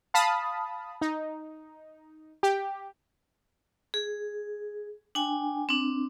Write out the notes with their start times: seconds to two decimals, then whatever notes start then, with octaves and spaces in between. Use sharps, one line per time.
0.14 F5 A5 B5 D#6
1.01 D#4
2.43 G4
3.94 G#4
5.15 D4 G5 G#5
5.69 C4 D4